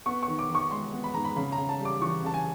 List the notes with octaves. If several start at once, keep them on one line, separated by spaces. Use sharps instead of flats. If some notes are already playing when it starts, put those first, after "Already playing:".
B3 C#6
C#6
D#3
D6
D#3
C#6
G#3 C6
B3
B5
G#2 A#5
B5
C#3 B5
A#5
C#3
A5
G3
D6
E3 C#6
C#3 A5
G#5